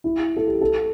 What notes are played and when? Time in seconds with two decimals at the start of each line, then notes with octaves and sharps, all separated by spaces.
0.04 E4
0.37 A4
0.47 G4
0.61 A4